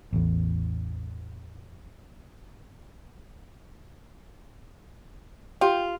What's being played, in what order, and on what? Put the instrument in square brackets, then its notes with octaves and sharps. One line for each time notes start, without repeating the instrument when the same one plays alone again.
[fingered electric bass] A1 E2
[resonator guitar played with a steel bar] F4 [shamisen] G4